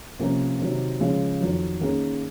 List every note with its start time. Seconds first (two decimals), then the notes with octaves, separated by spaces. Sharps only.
0.19 C3 F3 A#3 C#4
0.59 C3 D#3 F#3
1.00 C#3 F3 G#3
1.40 F2 D#3 F#3
1.81 D#3 A#3 C#4 G#4